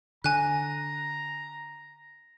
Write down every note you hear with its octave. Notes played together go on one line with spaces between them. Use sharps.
D3 G#5 A#5 F#6